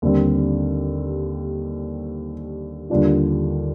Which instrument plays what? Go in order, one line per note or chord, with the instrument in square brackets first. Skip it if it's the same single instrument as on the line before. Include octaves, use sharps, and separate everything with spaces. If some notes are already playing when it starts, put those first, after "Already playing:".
[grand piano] D#2 D3 G3 C4
D#2 D3 G3 D4 F4